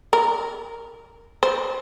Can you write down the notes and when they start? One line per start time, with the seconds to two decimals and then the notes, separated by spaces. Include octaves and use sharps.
0.13 A#4
1.43 C5